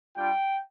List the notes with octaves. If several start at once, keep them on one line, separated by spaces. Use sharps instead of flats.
G3 D4 F4 G5